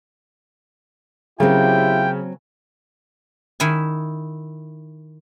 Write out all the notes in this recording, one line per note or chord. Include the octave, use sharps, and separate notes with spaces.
C#3 F#3 A#3 C4 E4 F4 G4 G5
D#3 E4 G#5